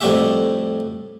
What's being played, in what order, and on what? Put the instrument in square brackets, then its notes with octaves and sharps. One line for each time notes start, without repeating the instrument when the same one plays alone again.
[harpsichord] F2 A2 G3 F#4 G4 E5